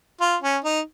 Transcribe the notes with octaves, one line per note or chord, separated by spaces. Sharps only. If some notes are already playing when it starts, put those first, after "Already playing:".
F4
C#4
D#4